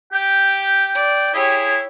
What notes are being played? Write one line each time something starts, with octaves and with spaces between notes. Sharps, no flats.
G4 G5
D5
E4 G4 G#4 C#5